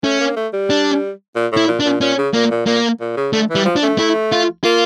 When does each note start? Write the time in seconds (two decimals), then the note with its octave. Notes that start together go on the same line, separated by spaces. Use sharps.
0.04 A3 C#4
0.20 A#3
0.36 A3
0.53 G3
0.70 D4
1.35 A#2
1.52 A2 E4
1.67 A#2
1.80 D4
1.85 A#2
2.01 A#2 C#4
2.18 C#3
2.34 A#2 A#3
2.51 A#2
2.66 A#2 A#3
3.00 A#2
3.17 C#3
3.33 D3 A3
3.50 E3
3.55 G3
3.65 F3
3.76 D4
3.83 A3
3.98 A3 E4
4.32 F4
4.64 A#3 F4